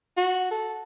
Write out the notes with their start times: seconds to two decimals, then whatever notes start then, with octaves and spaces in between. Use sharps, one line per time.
0.17 F#4
0.51 A4